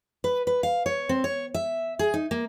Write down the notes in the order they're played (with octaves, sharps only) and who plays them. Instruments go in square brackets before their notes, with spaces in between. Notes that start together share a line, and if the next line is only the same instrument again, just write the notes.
[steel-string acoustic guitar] B4
B4
F5
C#5
C4
C#5
E5
G#4
D#4
A#3